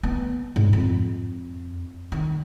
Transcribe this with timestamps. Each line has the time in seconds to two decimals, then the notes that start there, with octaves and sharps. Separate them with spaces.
0.03 B3
0.56 G#2
0.73 F2
2.12 D#3